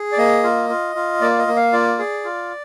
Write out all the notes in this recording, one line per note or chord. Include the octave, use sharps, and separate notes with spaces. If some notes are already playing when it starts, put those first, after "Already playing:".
Already playing: G#4
D5
A#3 D#5
F4
F4
F4
A#3 D5
D#5
A#3
F5
F4 D5
G#4
F4